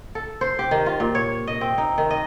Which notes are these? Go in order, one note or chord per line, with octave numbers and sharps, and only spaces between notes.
A4
C5
G4
D#3
F4
A#2
C#5
D#5
C4
D#4
D#3
D#5